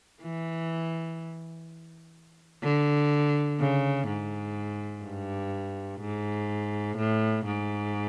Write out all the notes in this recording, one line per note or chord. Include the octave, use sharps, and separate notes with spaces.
E3
D3
C#3
G#2
G2
G#2
A2
G#2